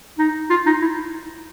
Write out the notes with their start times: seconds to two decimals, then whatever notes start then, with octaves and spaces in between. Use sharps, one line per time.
0.19 D#4
0.50 F4
0.66 D#4
0.82 E4